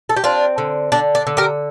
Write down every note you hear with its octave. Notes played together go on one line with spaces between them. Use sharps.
A4
G4
C4 D4 F4
D3
D3 D4
D4
D3
G4 A#4